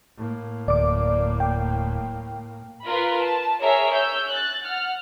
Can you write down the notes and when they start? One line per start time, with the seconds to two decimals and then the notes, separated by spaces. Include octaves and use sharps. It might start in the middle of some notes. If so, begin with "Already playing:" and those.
0.16 A2 A#3
0.68 D1 D5 D6
1.40 G5
2.86 F4 A#4 B4 B5 C6
3.21 A5
3.61 G#4 A#4 C#5 E5
3.91 C#5 E6 G6
4.30 F#6 A6
4.64 F#5 F6